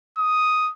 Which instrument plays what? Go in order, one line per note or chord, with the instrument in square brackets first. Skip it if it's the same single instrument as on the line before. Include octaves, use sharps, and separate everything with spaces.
[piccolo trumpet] D#6